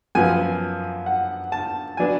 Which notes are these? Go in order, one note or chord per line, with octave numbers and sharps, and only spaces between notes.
F#2 F3 B3 G#5
F#5
A5
F#3 B3 D4 G#5